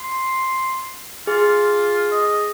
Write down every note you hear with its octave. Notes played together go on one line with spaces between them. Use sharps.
C6
F4 G#4
D#5